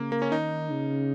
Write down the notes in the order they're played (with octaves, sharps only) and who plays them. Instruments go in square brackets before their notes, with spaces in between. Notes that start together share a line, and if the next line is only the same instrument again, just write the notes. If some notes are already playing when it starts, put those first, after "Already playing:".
Already playing: [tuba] C#3 [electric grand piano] A#3
[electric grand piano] A#3
C#4
[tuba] D#3 [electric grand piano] D#4
[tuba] C#3